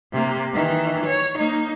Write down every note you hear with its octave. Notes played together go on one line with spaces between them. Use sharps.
C3 A#3
D#3 E3
C#5
A#3 D#4